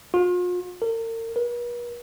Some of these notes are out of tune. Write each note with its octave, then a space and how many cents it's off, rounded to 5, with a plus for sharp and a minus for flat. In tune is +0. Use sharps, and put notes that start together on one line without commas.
F4 +40
A#4 -40
B4 -45